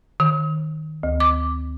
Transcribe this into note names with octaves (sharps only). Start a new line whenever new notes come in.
D#3
D2
D6